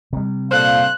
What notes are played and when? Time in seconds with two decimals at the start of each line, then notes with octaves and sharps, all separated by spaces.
0.13 C3 G3
0.51 A#2 A4 C5 D5 F5 F#6